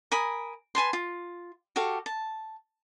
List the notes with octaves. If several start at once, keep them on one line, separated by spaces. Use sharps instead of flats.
A#4 G#5 B5 D#6
B4 G#5 A5 C6
F4
F#4 G4 A4 F5
A5